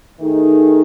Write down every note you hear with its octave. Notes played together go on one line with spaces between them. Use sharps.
D#3 A3 D#4 G#4